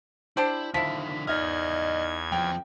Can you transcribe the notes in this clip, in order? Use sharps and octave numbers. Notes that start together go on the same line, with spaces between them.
D4 E4 G4 C5
D3 D#3 F3 E4 B6
E2 D#4 D5 D#5 F6 G#6
F2 F3 G5